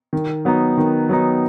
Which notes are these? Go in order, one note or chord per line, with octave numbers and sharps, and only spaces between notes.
D#3
F#3 B3 D#4
D#3
F#3 B3 D#4